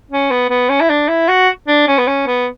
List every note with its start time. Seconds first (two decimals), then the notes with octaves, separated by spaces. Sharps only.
0.11 C#4
0.31 B3
0.49 B3
0.69 C#4
0.81 E4
0.90 D4
1.08 E4
1.28 F#4
1.67 D4
1.88 C#4
1.98 B3
2.07 C#4
2.27 B3